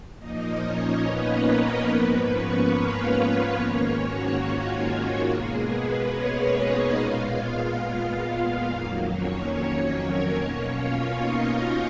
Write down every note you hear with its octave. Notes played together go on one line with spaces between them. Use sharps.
A#2 F3 A#3 D#4 D#5
C#4 C#5
B3 B4
A#3 A#4
G#2 F3 A#3 B3 B4
C#4 C#5
F4 F5
F4 F5
G#2 D#3 A#3 C#4 C#5
F#4
F4
F#4
B2 G#3 A#3 G#4
B3 B4
C#4 C#5
D#4 D#5
A#2 G#3 B3 F4 F5
F2 D#3 F#3 A#3
C#4 C#5
C#4 C#5
A#3 A#4
B2 A#3 C#4 C#5
F4 F5
D#4 D#5